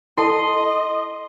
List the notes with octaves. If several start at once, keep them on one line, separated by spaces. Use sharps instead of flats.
E4 A4 D#5 A5 C6